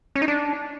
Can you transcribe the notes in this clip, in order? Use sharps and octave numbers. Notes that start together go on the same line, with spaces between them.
C#4
D#4
D4